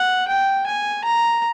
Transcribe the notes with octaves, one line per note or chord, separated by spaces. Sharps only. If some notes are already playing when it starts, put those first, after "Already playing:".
Already playing: F#5
G5
G#5
A#5